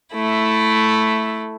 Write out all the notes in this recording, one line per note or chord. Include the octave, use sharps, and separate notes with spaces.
A3 E4